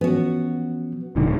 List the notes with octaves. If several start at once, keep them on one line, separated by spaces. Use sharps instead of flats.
E3 F3 B3 C#4 F#4
D#1 A#2 D3 G#3 D#4